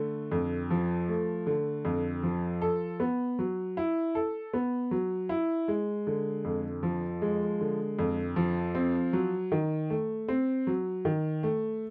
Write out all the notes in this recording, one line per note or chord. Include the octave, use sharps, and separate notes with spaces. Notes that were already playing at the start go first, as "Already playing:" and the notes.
Already playing: D3 A3
F2
F3
A3
D3
F2
F3
A4
B3
F#3
E4
A4
B3
F#3
E4
G#3
D3
F2
F3
G#3
D3
F2
F3
C4
F#3
D#3
A3
C4
F#3
D#3
A3